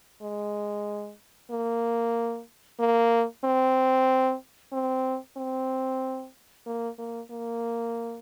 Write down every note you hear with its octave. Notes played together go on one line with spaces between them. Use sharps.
G#3
A#3
A#3
C4
C4
C4
A#3
A#3
A#3